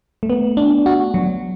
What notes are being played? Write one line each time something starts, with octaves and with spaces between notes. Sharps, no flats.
A3
B3
D4
F#4
F#3